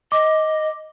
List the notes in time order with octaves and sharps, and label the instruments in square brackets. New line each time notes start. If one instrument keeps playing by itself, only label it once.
[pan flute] D#5 [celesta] D6